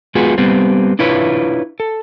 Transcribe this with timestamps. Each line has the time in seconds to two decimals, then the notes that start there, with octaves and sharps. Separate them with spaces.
0.15 G#3 B3 F4 F#4 G#4
0.38 G3 B3 C4
0.99 D4 E4 F4 B4 C#5
1.80 A4